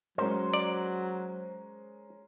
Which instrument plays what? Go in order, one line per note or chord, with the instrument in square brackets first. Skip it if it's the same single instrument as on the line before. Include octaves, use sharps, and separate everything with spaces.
[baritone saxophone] F#3 [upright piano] G#3 C#4 A#4 [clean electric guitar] C5
[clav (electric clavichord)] D5